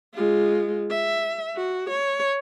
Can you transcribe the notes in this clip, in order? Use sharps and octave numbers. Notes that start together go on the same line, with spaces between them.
G#3 F4
E5
F#4
C#5